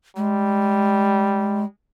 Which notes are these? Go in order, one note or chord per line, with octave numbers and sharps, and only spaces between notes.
G3 G#3